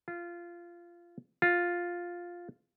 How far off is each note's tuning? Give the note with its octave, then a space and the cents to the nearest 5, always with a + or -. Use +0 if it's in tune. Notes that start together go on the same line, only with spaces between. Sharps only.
F4 -15
F4 +5